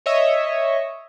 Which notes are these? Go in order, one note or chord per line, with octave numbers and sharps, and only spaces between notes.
C#5 D#5 E5